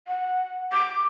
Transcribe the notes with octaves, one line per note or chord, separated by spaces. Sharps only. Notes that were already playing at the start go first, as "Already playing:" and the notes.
F#5
D6